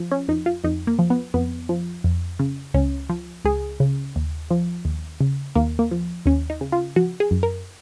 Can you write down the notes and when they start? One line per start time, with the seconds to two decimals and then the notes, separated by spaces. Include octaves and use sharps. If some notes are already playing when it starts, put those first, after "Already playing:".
Already playing: F3
0.12 C#4
0.28 F2 D#4
0.46 F4
0.64 F2 D#4
0.87 A#3
0.99 F3
1.10 B3
1.34 F2 B3
1.69 F3
2.04 F2
2.39 C#3
2.74 C#2 C#4
3.10 F3
3.45 C#2 G#4
3.80 C#3
4.16 D#2
4.51 F3
4.85 D#2
5.21 C#3
5.55 D#2 A#3
5.79 A#3
5.91 F3
6.26 D#2 C#4
6.50 D#4
6.61 C#3
6.72 F4
6.96 F3 F#4
7.20 G#4
7.31 F#2
7.43 A#4